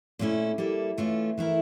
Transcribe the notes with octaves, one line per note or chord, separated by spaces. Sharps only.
A#2 A3 C#4 E4
G3 A#3 E4 A4
E3 A3 C#4 F4
E3 A3 E4 A#4